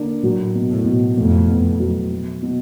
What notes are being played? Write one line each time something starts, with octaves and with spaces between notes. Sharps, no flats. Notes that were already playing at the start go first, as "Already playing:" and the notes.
Already playing: D3 A#3 D4
A2 F#3
B2
A2
B2
F2 A2
B3
F#3
B2
B2